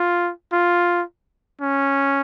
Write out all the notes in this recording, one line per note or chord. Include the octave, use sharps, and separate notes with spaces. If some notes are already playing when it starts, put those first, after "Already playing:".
Already playing: F4
F4
C#4